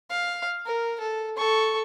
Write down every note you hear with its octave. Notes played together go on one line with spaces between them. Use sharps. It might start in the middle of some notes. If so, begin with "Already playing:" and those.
F5
A#4
A4
A4 C#6